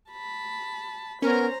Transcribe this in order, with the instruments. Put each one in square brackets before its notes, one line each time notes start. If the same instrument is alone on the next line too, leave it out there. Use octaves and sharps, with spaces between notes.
[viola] A5 B5
[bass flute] B3 [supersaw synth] C#4 [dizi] A#4 [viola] C5 A#5